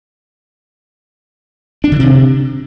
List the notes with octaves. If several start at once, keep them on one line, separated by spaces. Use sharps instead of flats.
D4
D3
C3